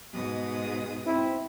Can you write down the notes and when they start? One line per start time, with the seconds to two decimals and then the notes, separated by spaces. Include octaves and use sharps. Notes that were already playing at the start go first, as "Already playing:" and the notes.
0.13 G#2 B2 D#6
1.05 C4 E4